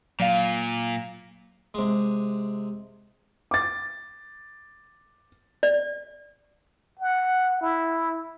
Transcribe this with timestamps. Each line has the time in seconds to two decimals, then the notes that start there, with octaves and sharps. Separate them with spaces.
0.20 A#2 F#3 F5 F7
1.74 C3 G#3
3.51 D6 A6
5.63 D5
6.99 F#5
7.61 E4